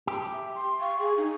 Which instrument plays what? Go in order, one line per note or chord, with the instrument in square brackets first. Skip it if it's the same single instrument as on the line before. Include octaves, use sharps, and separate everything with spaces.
[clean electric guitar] G4
[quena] E5
C6
[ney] F5 [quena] C#6
[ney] G#4
D#4